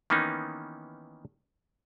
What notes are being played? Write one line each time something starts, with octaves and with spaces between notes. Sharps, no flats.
D#3 E3 A#3 B3 C#4 D#4